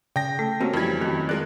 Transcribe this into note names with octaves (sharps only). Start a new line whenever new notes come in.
C#3 G5 A#6
A3 A4
A#3 C4 C#4 F#4 G4
F2 E3 G3 G#6
F#2 D#3 A3
G#3 F4 A#4 D5 F#6